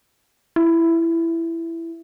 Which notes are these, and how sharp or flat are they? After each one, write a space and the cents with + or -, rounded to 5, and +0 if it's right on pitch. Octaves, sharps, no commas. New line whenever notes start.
E4 +10